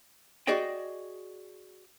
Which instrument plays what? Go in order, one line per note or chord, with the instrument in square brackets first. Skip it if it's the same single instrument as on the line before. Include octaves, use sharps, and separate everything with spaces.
[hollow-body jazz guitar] F#4 G#4 D5 D#5 G5